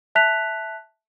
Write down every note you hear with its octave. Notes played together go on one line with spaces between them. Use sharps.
E5 A5 F#6 B6 F7